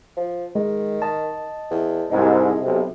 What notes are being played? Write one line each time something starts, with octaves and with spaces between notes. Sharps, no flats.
F3
D#3 G#3
D#5 A5
E2
C2 G#2 G#3
B1 C3